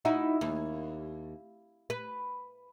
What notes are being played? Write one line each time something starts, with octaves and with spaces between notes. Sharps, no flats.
D#4 E4 F#4
D#2
B4